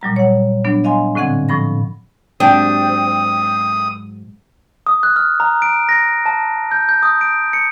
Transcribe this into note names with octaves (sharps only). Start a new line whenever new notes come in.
A#2 F#3 G3 A#5
C#5 F#5
F#3 B3 D4
D#5 F5 G#5 C6
A2 D3 C4 F#5 G#6
A2 F3 B5 A#6
G#2 F#3 C4 D4 G4 D#6
D#6
F#6
F6
A#5
D7
A#6
A5
G6
G6
D#6
D7
C#7